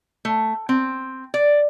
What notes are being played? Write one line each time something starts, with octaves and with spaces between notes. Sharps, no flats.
A3
C4
D5